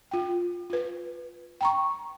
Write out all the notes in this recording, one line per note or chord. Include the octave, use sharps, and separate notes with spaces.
F4 G5
F4 B4
G5 A#5 C#6